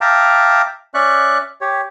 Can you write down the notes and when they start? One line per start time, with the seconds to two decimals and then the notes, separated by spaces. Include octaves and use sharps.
0.01 E5 F5 G5 A5 A#5 D6
0.94 C#4 D5 E5 C#6 F#6
1.61 G4 C#5